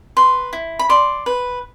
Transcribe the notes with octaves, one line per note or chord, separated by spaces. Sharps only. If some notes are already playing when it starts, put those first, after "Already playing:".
B4 C6
E4
B5
D5 C6
B4